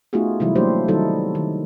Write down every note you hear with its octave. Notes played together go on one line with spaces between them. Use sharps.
A3 B3 D#4 F4 F#4 G#4
C3 E3 F#3 G3 E4
F#3 A3 A#3 D4 G4 C5
D#3 F#3 G3 D#4 E4 A4
D#3